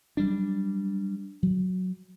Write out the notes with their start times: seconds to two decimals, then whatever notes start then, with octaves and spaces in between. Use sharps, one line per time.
0.17 F#3 G3 D4
1.43 F#3